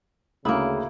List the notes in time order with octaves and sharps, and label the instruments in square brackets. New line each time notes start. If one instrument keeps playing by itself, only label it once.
[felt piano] D2 D#6 [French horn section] C#3 [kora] A#3 E4